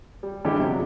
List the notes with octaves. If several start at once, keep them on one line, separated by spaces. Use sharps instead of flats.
G3
G2 D3 E3 G#3 E4 G4
C3 F3 F#3